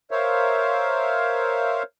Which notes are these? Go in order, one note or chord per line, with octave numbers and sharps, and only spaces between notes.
A#4 C5 C#5 E5 F5